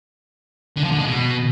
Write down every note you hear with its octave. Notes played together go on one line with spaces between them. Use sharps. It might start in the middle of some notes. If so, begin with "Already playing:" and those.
D3
F3
D3
G#3
B2